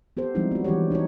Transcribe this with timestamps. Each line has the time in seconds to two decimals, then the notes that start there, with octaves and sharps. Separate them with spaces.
0.17 B3 G4 A4 C5
0.35 F3 G3 G#3 C4 D#4 E4
0.51 B3 F#4
0.64 E3 G3 D4 F#4 G4 C#5
0.90 D4 D#4 F#4 C#5